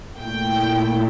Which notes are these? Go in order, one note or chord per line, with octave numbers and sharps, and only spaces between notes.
A#2 A3 E4 G5